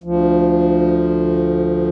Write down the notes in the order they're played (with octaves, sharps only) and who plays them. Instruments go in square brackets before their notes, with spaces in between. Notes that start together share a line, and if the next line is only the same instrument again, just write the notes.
[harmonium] D2 F3